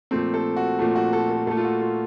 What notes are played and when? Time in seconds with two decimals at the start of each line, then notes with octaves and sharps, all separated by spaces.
0.11 A#2 F3 A3 C4
0.34 A4
0.57 F#4
0.79 A#2 F3 A3
0.96 F#4
1.13 A4
1.30 A4
1.47 A#2 A3 A4
1.57 F4
1.64 F#4
1.82 F4